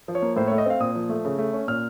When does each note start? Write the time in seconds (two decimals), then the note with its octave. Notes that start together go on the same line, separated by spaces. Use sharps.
0.08 F3
0.15 C#5
0.22 A#3
0.36 A2 C5
0.47 C#5
0.51 A3
0.58 D#5
0.66 C4 F5
0.80 A#2 D#6
0.95 F3
1.09 A3
1.25 C#3
1.38 A3
1.53 C#4
1.68 A#2 F6